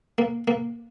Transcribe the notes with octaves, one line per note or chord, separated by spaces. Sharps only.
A#3
A#3